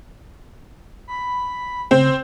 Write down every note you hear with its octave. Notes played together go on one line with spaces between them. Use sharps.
B5
C#3 C4